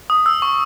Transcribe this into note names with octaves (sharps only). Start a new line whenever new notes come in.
D#6
E6
C#6